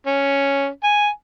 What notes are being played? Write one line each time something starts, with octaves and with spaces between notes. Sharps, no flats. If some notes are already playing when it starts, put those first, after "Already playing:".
C#4
G#5